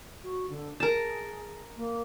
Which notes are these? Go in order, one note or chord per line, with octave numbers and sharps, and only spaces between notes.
F#4
D3
G#4 A#4 A5
A#3